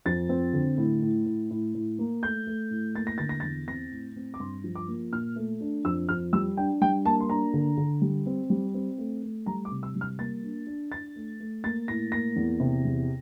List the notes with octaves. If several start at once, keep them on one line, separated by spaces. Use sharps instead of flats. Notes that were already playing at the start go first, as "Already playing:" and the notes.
F2 A6
C4
D3
A2
A2
A2
A2
A2
A#3
A3 G6
A3
A2
A#3 A6
A#6
D3 A6
A#6
E2 A6
C4 A#6
A2
C4
D6
G2 C6
F3
D6
A#3
A#2 F6
A3
D4
F2 E6
F2 F6
G3 E6
D4 G5
G3 G5
A#3 A5
C6
D4 A#5
D3
D3
G3
C4
G3
C4
A3
A3
G3 A#5
D6
C3
E6
G3
F6
A#3 A6
D4
D4
D4 A6
A3
A3
A#3 A6
A2 A#6
A#3 A#6
E2
C3
E2